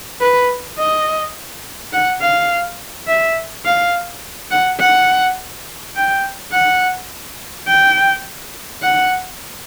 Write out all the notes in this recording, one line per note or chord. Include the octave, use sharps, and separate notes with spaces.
B4
D#5
F#5
F5
E5
F5
F#5
F#5
G5
F#5
G5
F#5